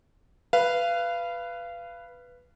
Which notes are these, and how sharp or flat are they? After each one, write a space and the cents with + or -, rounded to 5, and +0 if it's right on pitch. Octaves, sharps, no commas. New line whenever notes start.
B4 +0 F5 -25